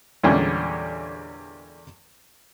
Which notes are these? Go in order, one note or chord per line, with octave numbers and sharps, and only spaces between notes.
E2 A#2 D3 G3 G#3 C#4